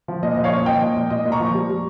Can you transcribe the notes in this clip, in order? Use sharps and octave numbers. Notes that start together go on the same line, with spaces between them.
F3
A#2 D#5
F3
C#5 F5
A#2
F3 D#5 G5
A#2
A#2
A#2 D#5
A#2
A#5 C#6
F3
G3
G3